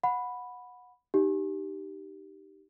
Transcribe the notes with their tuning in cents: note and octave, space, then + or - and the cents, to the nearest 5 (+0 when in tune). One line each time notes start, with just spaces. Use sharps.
F#5 -20 B5 +0
D#4 -15 G4 -15